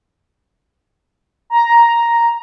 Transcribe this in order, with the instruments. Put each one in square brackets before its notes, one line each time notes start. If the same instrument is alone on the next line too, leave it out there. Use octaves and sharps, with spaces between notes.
[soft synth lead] A#5